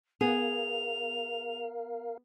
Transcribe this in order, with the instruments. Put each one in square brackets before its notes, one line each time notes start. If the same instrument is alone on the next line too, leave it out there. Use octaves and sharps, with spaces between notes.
[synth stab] B3 [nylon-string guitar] G#4 [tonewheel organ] A#4 F5 [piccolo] F7